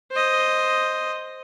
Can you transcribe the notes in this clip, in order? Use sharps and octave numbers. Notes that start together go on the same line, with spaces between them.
C5 D#5